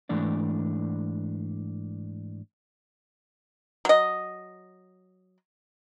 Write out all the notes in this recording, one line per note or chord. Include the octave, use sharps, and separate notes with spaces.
G#2 E3 A3 D4 D5
F#3 D#5